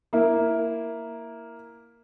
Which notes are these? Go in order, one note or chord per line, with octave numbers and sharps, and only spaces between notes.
A#3 E4